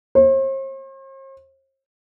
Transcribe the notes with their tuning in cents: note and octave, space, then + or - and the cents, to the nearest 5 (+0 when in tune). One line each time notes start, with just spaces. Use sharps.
C5 +45